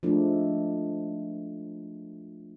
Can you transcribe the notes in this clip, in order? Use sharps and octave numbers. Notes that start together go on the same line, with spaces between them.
F3 G#3 A3 D4